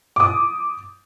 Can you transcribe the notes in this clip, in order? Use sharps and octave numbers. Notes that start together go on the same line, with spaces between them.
D6 D#6